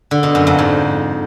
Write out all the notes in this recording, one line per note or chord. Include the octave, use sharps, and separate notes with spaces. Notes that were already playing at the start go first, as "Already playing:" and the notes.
D3
B2
F#2
F2
G#2